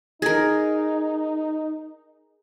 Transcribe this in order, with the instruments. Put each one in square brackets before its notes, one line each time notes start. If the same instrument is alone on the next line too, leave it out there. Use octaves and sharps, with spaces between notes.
[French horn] D#4 [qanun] G#4 A#4